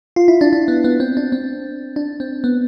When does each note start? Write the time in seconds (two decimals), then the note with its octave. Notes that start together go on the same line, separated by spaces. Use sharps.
0.16 F4
0.28 E4
0.41 D4
0.53 D4
0.68 B3
0.84 B3
1.00 C4
1.17 D4
1.32 C4
1.96 D4
2.20 C4
2.44 B3